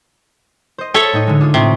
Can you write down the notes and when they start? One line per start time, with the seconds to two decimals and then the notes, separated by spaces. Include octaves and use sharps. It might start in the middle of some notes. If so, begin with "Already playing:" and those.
0.78 C5 D#5
0.94 A4 C#5 E5
1.13 A2 D#4 D#5
1.27 D3 G#3
1.41 D4 F4 D#6
1.54 A2 C3 F4 C#5